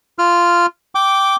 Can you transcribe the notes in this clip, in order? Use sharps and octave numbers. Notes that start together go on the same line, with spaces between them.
F4 F6
G5 D6